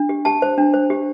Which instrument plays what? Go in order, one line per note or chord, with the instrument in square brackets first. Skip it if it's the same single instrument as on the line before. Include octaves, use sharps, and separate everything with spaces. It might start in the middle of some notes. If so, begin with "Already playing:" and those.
Already playing: [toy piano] D4
G4
G4 A5
C5
D4
C5
G4